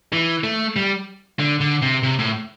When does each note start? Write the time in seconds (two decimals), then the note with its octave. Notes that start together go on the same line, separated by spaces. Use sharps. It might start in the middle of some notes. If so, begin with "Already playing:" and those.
0.13 E3
0.44 A3
0.76 G3
1.39 D3
1.60 D3
1.82 C3
2.03 C3
2.19 A2